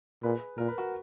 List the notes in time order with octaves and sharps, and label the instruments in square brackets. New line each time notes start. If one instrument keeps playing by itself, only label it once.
[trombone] A#2 [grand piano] G#4 B4
[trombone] A#2 [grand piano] A#4
[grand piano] B4
F#4 A#4